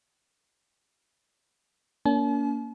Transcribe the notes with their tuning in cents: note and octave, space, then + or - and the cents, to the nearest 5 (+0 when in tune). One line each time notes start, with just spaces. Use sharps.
A#3 +0 C#4 +40 A5 -45